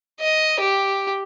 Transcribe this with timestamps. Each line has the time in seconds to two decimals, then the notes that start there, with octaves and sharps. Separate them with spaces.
0.20 D#5
0.61 G4